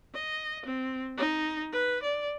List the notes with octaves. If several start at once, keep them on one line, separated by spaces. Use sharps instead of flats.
D#5
C4
D#4
B4
D5